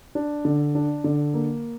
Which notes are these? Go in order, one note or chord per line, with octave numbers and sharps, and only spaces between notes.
D4
D3
D4
D3
A#3